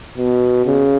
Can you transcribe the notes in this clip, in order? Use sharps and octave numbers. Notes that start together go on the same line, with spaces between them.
B2
C#3